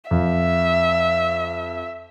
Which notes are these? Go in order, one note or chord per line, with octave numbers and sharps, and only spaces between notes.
F2 E5